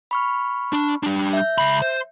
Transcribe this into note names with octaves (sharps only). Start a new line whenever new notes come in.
B5 C#6 F6
D4
G3 D4
E5 G6
C#2 B5
C5